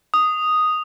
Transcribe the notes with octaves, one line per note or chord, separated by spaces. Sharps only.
D#6